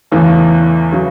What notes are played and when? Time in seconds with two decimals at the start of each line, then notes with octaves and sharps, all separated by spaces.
0.12 E2 C#3 E3 A3 C#4
0.93 C#3 F#3